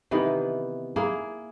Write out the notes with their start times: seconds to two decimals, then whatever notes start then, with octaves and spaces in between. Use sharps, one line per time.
0.11 C3 D#3 E3 B3
0.96 A#3 E4 G#4